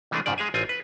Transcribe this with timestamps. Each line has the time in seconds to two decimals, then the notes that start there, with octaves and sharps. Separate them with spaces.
0.11 C3 E3 G#3 A3 D4 G#4
0.26 F2 G#2 C#3 F3 D5
0.38 G#3 G#4 F5 G#5
0.54 A1 C4 F4 G#5
0.69 B4